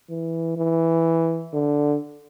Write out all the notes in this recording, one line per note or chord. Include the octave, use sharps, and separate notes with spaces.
E3
E3
D3